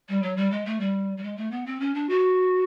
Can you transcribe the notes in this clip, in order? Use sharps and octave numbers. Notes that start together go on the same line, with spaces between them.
G3
F#3
G3
G#3
A3
G3
G3
G#3
A3
B3
C4
C#4
D4
F#4